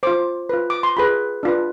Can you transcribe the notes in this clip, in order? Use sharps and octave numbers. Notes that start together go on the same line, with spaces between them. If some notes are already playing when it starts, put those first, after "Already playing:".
F4 C5 D6
F4 B4
D6
C6
F4 G#4 B4 B5
D4 F4 B4